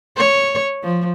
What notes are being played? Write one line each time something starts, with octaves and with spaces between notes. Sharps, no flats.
C#5
F3